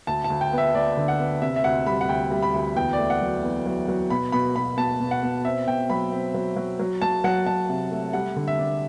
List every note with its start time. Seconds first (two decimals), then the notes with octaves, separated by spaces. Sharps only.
0.07 D2 A5
0.24 A5
0.30 D2
0.41 G5
0.53 B3
0.58 E5
0.74 D2 D5
0.97 D3
1.08 F#5
1.19 B3
1.42 C3 E5
1.56 E5
1.64 D2 F#5
1.86 G3 B5
2.01 F#5
2.09 D2 G5
2.31 G3
2.42 B5
2.54 D2
2.76 E2 G5
2.93 D5
2.98 A3
3.10 F#5
3.21 F#3
3.43 E2
3.66 F#3
3.88 F#3
4.10 B2 B5
4.32 B2 B5
4.56 B2 B5
4.77 B2 A5
5.00 B2
5.11 F#5
5.23 B2
5.45 C4 E5
5.67 B2 G5
5.90 F#3 B5
6.12 C4
6.34 F#3
6.56 F#3
6.79 F#3
7.02 F#3 A5
7.24 F#3 F#5
7.46 F#3 A5
7.69 C3
7.91 A3
8.13 G3 F#5
8.36 D3
8.48 E5
8.59 D4